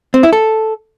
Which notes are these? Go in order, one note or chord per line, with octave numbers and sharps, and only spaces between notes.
C4
E4
A4